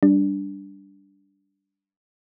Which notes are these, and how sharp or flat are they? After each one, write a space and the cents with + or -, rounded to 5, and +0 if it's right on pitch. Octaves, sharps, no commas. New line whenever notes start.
G3 +0 D4 -10